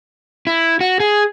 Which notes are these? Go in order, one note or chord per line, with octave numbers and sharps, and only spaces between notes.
E4
F#4
G#4